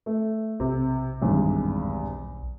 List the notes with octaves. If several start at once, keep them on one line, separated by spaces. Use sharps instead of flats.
A3
B1 C3
G#1 E2 G2